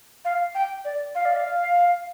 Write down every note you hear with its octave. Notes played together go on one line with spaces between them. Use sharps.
F5
G5
D5
F5
D5
F5